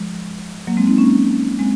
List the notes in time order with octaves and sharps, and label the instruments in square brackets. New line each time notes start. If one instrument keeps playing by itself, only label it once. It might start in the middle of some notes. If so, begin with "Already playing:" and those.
Already playing: [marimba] F3 G#3
F#3 A#3
G#3 C4
C4 D#4
A#3 C#4
G#3 C4